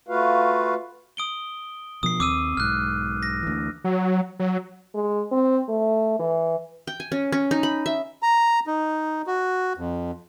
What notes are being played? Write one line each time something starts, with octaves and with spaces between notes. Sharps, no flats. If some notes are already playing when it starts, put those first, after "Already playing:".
A3 F4 F#4 B4 F5
D#6 D7 G7
B2 F3 D#6 C7
D#2 C4 D6 E6 D#7
B1 G#2 F6 F#6
A#6
D2 E3
F#3
F#3
G#3
C4
A3
E3
G5
G#5
C#4
C#4
D#4
B5
E5
A#5
D#4
F#4
F2